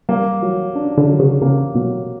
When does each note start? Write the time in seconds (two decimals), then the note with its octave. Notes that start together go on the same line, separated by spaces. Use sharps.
0.09 G3 A#3
0.42 F#3
0.75 D4
0.98 D3
1.09 F#3
1.19 C#3
1.42 C#3 A#3
1.75 B2 F#3